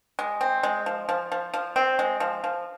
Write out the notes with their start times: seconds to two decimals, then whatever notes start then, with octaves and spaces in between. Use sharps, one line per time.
0.19 G#3
0.41 C4
0.63 G#3
0.86 F3
1.09 F3
1.32 F3
1.54 F3
1.76 C4
1.99 G#3
2.20 F3
2.44 F3